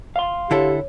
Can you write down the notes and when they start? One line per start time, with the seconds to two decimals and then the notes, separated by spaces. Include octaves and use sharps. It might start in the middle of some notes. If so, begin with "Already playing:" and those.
0.16 F5 C6
0.51 D3 E4 G4 A4 C#5